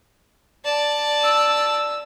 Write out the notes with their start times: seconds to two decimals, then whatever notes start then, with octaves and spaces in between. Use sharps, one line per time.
0.65 D5 A5
1.23 E6